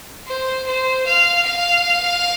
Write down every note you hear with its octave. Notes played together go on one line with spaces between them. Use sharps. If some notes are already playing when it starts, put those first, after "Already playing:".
C5
C5
F5
F5